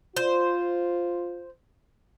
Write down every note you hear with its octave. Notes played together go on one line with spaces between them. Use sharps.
F4 C5